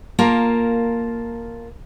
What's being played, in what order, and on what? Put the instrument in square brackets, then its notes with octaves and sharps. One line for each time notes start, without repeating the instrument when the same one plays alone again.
[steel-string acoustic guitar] A#3 F4 A#4 A5